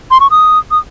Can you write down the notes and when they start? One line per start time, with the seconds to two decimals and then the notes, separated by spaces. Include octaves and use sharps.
0.11 C6
0.20 C#6
0.31 D#6
0.71 D#6